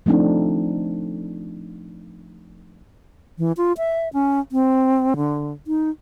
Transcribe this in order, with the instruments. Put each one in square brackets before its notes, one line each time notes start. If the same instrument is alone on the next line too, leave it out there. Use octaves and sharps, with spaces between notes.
[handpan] F3 A3 C4 D4 D#4
[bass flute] E3
F4
E5
C#4
C4
D3
D#4